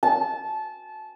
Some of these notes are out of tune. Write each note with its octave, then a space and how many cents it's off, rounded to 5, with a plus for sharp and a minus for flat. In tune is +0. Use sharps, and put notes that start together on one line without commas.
A5 -20